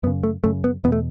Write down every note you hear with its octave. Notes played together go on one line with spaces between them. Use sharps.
F#2 C#3 B3
A3
F#2 C#3 A3
B3
E2 B2 B3
A3